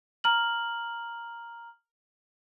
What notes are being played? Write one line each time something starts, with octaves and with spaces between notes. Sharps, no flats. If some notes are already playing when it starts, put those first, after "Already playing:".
A#5 F6 F#7